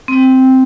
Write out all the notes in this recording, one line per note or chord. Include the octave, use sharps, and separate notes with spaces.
C4